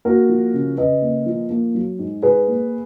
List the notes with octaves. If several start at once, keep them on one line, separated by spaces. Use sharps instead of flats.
A#3 F#4 A#4
F3
C#3
C#3 B4 D#5
A#3
F3
A#3
F#3
G#2
G#2 G#4 B4
A#3